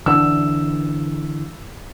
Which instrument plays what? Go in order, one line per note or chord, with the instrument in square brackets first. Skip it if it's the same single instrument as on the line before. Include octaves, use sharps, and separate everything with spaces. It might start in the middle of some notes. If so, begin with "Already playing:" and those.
[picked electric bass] D3 E3 D4 [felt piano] E6